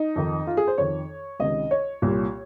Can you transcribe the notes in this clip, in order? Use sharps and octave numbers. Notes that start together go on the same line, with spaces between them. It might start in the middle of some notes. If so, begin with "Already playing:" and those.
Already playing: D#4
F2 D#3
F4
G#4
C5
F2 D#3 C#5
C#2 C3 D#3 D#5
C#5
C2 A#2